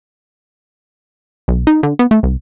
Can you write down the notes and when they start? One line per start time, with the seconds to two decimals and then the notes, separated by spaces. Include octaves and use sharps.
1.48 B1
1.67 D#4
1.83 D3
1.99 B3
2.11 A3
2.23 C2